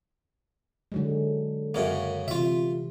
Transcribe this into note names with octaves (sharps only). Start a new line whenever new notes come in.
D3 F#3 G#3
F#2 C#3 A#3
C3 E3 F4 E5